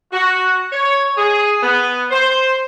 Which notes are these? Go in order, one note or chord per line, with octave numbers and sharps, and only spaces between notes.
F#4
C#5
G#4
B3
C5